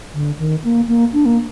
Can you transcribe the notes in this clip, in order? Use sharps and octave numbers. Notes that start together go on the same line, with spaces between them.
D3
D#3
A#3
A#3
D4
A#3